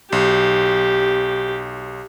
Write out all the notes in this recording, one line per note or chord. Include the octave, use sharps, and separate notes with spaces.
B1 G4